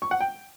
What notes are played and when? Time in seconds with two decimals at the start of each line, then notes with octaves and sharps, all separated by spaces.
0.02 C#6
0.11 F#5
0.21 G5